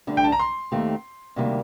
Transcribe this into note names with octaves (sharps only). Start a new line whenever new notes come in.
D2 D3 G3 D4
G5
A5
A#5
C6
D#2 D#3 A3 C4 G4
D2 C3 D#3 G3 A#3